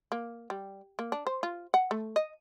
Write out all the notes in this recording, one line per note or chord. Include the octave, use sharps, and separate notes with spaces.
A#3
G3
A#3
D4
C5
F4
F#5
A3
D#5